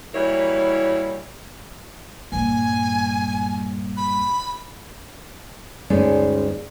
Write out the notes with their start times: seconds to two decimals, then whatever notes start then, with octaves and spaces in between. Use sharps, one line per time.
0.14 E3 F#3 G3 A#3 E4 C#5
2.32 G2 A#2 G#5
3.97 B5
5.90 D2 G2 G#3 C#4 D#4 D5